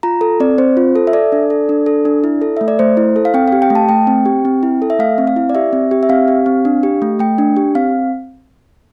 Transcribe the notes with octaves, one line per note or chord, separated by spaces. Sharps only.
F4 A#5
A4
C4 D5
C4 C5
F4
A4
E5
A4 D5
D4
A4
D4
A4
D4
E4
A4
A3 E5
D5
A3 C5
E4
A4
F5
C4 G5
G4 F5
G5
A3
A5
A3 G5
C4
G4
C4
E4
A4
E5
A3 F5
C4
F5
E4
D5
G4 E5
C4
G4
E5
C4 F5
G4
C4
D4
G4
A3
A3 G5
D4
G4
C4 F5